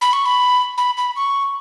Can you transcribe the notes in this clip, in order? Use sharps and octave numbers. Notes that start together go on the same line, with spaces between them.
B5
C#6
B5
B5
B5
C#6